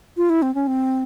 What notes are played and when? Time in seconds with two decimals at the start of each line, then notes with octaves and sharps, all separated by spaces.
0.17 F4
0.30 E4
0.42 C4
0.55 C#4
0.67 C4